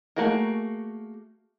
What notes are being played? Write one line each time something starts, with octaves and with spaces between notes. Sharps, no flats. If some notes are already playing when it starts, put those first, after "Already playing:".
A3 A#3 F#4 G#4 A#4